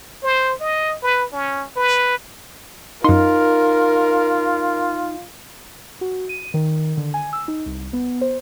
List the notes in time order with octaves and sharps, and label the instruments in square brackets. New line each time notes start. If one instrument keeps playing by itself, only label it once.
[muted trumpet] C5
D#5
B4
C#4
B4
[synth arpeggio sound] F#2 C6 [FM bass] D#4 [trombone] F4 [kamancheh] A#4
[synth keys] F#4
D#7
D#3
D3
G#5
E6
D#4
C2
B3
C5